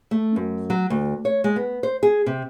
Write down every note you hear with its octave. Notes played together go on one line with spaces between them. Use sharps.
A3
F#2
F#3
D2
C#5
G#3
B3
C5
G#4
C3